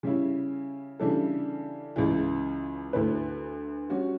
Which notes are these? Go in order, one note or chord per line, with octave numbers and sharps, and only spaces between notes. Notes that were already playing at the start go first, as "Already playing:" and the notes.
C#3 G3 C#4 E4
C#3 E3 G3 D4 A4
C#2 C#3 E3
D2 D3 A3 E4 B4
G3 C#4 F#4